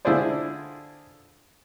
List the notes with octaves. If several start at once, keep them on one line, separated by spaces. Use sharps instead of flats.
D3 E4 F4 G#4 C5 D5